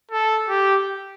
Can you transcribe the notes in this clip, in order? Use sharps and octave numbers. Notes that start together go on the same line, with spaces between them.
A4
G4